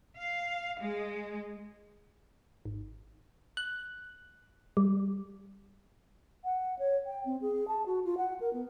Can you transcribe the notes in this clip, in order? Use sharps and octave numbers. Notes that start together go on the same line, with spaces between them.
F5
G#3
G#1
F#6
G3
F#5
C#5
G5
C4
G#4
A5
F#4
F4
F#5
A#4
B3